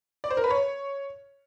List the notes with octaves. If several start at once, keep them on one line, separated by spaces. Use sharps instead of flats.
D5
C5
A#4
B4
C#5